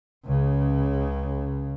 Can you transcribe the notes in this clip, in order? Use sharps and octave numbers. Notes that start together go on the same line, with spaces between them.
C#2 C#3